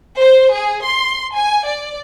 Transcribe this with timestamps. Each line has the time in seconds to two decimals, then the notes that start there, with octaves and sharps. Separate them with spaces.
0.19 C5
0.53 G#4
0.85 C6
1.35 G#5
1.66 D5